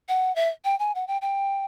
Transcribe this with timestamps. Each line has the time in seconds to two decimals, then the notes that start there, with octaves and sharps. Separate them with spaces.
0.09 F#5
0.36 E5
0.65 G5
0.79 G#5
0.95 F#5
1.08 G5
1.22 G5